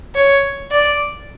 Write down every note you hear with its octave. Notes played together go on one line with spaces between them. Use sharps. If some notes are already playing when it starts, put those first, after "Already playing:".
C#5
D5